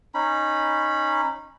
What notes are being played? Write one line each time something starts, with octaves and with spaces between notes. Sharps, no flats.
C#4 D#4 B5